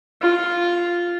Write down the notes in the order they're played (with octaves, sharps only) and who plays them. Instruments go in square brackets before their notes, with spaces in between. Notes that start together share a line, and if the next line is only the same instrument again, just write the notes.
[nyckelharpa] F4